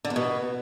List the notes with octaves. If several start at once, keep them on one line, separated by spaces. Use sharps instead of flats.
D3
E2
B2